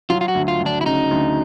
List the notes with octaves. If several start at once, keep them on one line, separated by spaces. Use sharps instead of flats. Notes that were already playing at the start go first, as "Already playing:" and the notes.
F#3 F4
F4
F#4
D2
F4
D2
D4
E4
C#3 D#4
D2